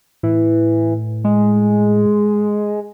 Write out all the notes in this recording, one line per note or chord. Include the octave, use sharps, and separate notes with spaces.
A2 E3
G#3